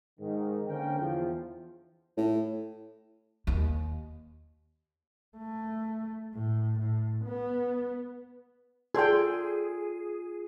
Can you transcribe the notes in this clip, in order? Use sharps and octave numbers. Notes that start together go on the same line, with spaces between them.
G#2 D#3
D3 A#3 C4 C#4 A#4 G5
E2 F3
A2
D#2
A3
A2
A2
B3
F4 F#4 G#4 A4 D5 G5 C6